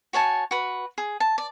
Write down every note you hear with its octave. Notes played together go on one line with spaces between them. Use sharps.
F#4 C#5 G#5 A5
F#4 B4
G#4
A5
D5